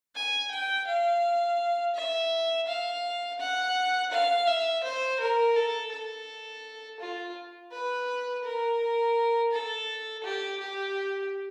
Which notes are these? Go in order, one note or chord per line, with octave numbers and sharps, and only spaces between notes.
G#5
G5
F5
E5
F5
F#5
F5
E5
C5
A#4
A4
A4
F4
B4
A#4
A4
G4
G4